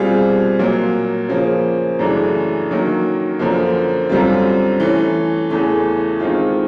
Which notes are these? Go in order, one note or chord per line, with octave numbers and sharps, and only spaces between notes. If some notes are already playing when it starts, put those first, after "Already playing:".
Already playing: B2 G3 C4 F4 G#4
A#2 F#3 A#3
C#3 F3 A#3 C#4
F#2 C#3 E3 A3 D4
D#3 F#3 A#3 C#4
F#2 D3 F3 A#3
F#2 D3 G3 C4 F4
E3 A3 C#4
E2 C#3 E3 A3
D#3 G#3 C4 F4